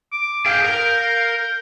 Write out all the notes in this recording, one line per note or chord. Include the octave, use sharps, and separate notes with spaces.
D6
G#4 F5 G5 G6
A#4